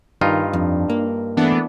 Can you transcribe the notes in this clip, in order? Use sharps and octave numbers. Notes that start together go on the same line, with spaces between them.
G2 D#3 D#4 F4
F2 D4
A#3
E3 A3 B3 D4